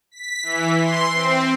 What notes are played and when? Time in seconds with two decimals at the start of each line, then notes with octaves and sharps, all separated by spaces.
0.11 B6
0.43 E3
0.82 C6
1.14 C4